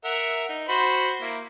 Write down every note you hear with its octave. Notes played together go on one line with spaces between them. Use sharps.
A#4 E5 F#5
D#4
F#4 C5 B5
A#3 E4